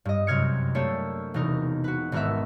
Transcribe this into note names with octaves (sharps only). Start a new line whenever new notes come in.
G2 D#5
F#2 C3 C4 F6 G#6 C#7
A3 A#3 D4 G4 A4 C#5
E1 C3 D#4 A#4
F#4 B4
G#1 B3 A#4 B4 E5